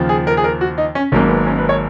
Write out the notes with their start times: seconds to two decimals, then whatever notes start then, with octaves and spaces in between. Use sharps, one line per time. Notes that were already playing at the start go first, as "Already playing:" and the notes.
Already playing: D#2 C#3 F3
0.09 G#4
0.27 A#4
0.37 G#4
0.44 A#4
0.61 F#4
0.78 D#4
0.95 C#4
1.12 G#1 G#2 F#3 A#3 C#4
1.29 B3
1.46 C#4
1.58 B4
1.69 C#5